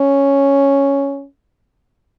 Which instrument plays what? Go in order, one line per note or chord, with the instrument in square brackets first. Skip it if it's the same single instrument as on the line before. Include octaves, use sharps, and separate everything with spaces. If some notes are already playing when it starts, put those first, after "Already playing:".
Already playing: [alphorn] C#4